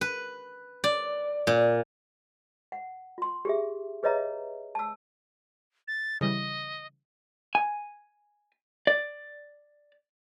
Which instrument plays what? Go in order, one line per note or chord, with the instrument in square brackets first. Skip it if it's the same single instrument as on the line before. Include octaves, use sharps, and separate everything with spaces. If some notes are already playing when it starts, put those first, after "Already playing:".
[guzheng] B4
D5
A#2
[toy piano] F#5
F4 C6
G4 G#4 E5
G#4 B4 C#5 D#5 E5 A#5
A5 E6
[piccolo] A6
[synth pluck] C#3 E3 G3 [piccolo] D#5
[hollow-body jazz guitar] G#5
D5